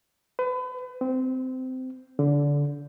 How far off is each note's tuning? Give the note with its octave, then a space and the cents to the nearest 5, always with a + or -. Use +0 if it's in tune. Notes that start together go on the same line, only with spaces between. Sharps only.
B4 +35
C4 -20
D3 -25